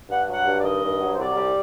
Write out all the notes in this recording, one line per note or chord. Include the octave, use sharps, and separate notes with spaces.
G2 F#5
F#3 F#5
G2
D5
D#3 D#5
G2
F#3
C5
C2 D5
G3